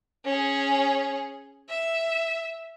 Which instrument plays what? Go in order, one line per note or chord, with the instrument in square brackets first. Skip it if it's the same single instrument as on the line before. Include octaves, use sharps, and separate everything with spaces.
[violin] C#4 G#4
E5